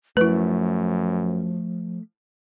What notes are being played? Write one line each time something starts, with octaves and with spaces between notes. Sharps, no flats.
F#2 F3 A3 E4 B4